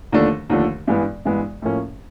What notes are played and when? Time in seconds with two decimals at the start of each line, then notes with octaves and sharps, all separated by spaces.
0.12 D#2 D3 F3 A3 D4
0.50 D#2 D3 F3 A3 D4
0.87 G2 E3 G#3 B3
1.25 G2 E3 G#3 B3
1.62 A2 F3 A#3 C#4